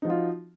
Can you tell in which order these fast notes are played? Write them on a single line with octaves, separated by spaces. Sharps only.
D#4 F3 F#4 F4